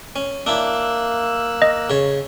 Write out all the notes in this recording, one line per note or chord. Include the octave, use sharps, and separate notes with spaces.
C#4
A#3 D4 E4 E6 F#6
D#5
C#3 C#5